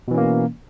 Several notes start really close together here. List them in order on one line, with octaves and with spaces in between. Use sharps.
B2 E3 C#4 A#3